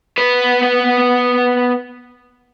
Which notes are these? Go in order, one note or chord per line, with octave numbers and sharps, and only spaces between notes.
B3 B4